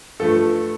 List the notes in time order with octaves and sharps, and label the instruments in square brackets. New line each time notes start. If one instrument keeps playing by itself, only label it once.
[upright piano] G2 F3 A3 A4